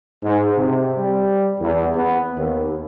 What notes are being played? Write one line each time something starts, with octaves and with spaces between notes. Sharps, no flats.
G#2
C3
G3
E2
B3
D#2